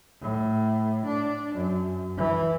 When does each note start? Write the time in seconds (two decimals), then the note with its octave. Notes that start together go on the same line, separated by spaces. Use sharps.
0.21 A2
1.06 D4
1.56 F#2
2.17 E3